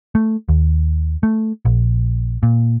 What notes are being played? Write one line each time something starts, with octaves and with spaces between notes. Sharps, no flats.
A3
D#2
A3
A#1
A#2